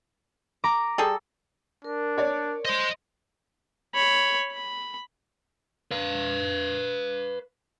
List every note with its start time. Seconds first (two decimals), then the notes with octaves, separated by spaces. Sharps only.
0.64 A#5 D6
0.98 G3 G#4 A4
1.84 D4 A#4
2.18 C#5 D5
2.65 C5 D#5 C6
3.94 C#5 B5
4.51 B5
5.91 B4 F5